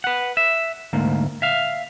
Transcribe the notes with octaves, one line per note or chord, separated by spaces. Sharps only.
B4 F#5
E5
D2 G#2 A#3
E5 F5